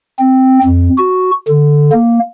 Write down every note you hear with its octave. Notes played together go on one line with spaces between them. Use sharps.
C4
F2
F#4
D3
A#3